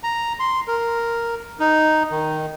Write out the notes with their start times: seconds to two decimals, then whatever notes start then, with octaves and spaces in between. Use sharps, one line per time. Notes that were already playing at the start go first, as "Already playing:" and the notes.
0.03 A#5
0.40 C6
0.68 A#4
1.60 D#4
2.11 D#3